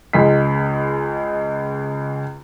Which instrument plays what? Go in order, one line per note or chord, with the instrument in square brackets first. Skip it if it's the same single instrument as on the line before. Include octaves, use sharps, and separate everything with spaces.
[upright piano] C#2 G#3 B6